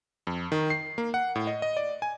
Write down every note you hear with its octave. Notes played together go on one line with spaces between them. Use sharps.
F2
D#3
C7
A#3
F#5
A2
D#5
D#5
D5
G#5